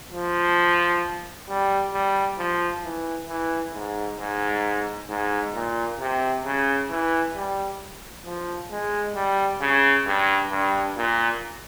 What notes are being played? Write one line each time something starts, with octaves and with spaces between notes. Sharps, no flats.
F3
G3
G3
F3
E3
E3
G#2
G#2
G#2
A#2
C3
C#3
E3
G3
F3
G#3
G3
C#3
G2
G2
A#2